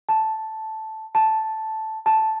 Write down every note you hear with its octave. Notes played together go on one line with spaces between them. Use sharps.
A5
A5
A5